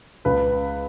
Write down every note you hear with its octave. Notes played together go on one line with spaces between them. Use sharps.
C#2 B4